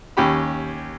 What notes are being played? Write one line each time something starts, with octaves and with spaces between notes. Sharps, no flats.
D#2 C#4 G4 B5